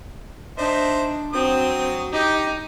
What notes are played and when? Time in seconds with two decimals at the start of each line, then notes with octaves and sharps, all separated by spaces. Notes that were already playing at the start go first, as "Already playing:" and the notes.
0.58 D4 D#4 C5 E5
1.33 F#3 C4 D#6
2.13 D#4 G4